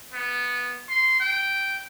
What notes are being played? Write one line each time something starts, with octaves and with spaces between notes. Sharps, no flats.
B3
C6
G5